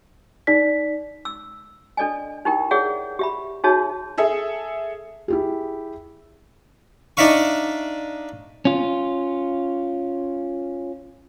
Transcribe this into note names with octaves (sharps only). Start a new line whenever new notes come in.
D#4 D5 B6
E6
D4 A4 D5 D#5 G#5
D#4 E4 G4 A#4 G5
G#4 A#4 C#5 D5 E5 F#5
G4 E5 B5
D#4 F#4 G#4 C#5 E5 A5
G#4 A4 E5
E4 G4 G#4
D4 D#4 D5 E5 F5 C#6
C#4 F4